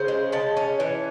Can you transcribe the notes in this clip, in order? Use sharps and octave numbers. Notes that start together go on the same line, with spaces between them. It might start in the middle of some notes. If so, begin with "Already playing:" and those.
Already playing: C#3 C5
G#3
C#3 A5
C#4
E3